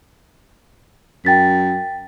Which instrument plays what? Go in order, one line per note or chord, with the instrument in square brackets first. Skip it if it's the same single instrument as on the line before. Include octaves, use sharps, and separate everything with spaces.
[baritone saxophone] F#2 [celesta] G5 A6 B6